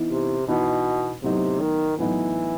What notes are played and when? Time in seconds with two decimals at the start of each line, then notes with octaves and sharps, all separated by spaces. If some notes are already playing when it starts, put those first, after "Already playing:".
Already playing: E3 B3 D#4
0.11 C3
0.48 B2 E3 B3 D#4
1.23 A2 C3 F#3 B3 D#4
1.60 D#3
1.98 A2 E3 F#3 B3 D#4